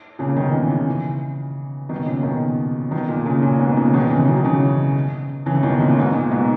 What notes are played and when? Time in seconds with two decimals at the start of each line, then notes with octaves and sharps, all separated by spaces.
0.19 A#2 C#3
0.36 B2 D#3
0.53 C#3 E3
0.70 C#3 E3
1.89 B2 D#3
2.06 A#2 C#3
2.23 B2 D#3
2.91 B2 D#3
3.09 A#2
3.26 A#2 C#3
3.42 A#2 C#3
3.59 G#2 B2
3.77 A#2 C#3
3.94 B2 D#3
4.10 C#3 E3
4.27 D#3 F#3
4.44 C#3 E3
5.46 C#3 E3
5.63 B2 D#3
5.80 A#2 C#3
5.98 G#2 B2
6.14 A#2
6.31 G#2 B2